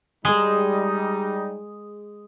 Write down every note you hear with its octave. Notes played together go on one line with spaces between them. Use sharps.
G3 G#3 D#4 G#4 D#6 E7